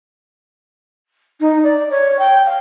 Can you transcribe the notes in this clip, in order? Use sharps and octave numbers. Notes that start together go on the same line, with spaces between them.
D#4
D5
C#5
G5
F5